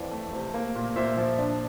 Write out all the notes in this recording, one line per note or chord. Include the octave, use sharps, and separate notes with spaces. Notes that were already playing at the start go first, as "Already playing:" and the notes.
Already playing: F2 E3 D5 F5
A3
C3
A#3
A#2
A#2 C5 E5
F3
D4